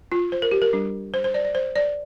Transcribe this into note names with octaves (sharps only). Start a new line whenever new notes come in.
F4
C5
A#4
G4
A#4
G3 D4
C5
C5
D5
D5
C5
D5